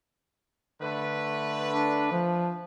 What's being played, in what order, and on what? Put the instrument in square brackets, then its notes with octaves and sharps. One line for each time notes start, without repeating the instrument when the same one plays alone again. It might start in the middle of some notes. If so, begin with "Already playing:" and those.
[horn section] D3 A3 B4
[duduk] D4
F3